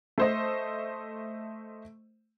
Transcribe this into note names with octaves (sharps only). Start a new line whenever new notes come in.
A3 C5 D#5